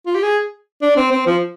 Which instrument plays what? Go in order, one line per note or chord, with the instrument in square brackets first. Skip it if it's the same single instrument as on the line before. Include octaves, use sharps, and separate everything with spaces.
[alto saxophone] F4
G4
G#4
D4
C4
C4
F3